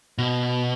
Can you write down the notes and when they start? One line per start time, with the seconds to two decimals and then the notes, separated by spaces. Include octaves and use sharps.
0.18 B2